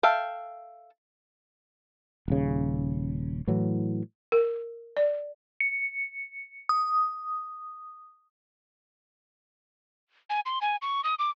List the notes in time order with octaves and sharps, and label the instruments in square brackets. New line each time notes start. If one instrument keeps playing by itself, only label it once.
[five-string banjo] A4 E5 F5 G5
[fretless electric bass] D#1 C#3
A2 E3 F#3
[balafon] A#4
D5
[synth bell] C#7
D#6
[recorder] G#5
C6
G#5
C#6
D#6
D6